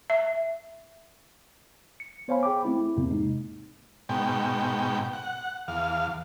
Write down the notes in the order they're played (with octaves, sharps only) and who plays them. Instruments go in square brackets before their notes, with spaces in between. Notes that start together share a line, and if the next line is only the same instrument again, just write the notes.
[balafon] E5
[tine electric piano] C#7
B3 C5 C#5 F5 G#5 B5
G#4 G5 B5 D6
A3 C4 E4
E2 G#2 C3 A#3
G#3 D#4
[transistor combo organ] G#2 B2 G5
F#5
E2 F5